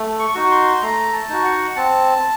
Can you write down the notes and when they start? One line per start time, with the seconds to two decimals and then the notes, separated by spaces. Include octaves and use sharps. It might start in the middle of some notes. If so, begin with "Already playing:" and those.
Already playing: A3
0.19 C#6
0.35 D#4 F#4
0.51 C6
0.82 A3 A#5
1.13 A5
1.29 D#4 F#4
1.45 F#5
1.76 C4 A5